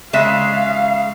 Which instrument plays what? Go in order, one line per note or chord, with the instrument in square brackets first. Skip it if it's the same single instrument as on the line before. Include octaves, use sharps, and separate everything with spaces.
[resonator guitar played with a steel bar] C#3 G#3 E5 [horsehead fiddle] F5